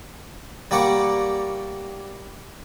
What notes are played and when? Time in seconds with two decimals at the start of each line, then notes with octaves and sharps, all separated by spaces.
0.71 G3 A#3 D5 F#5 C#6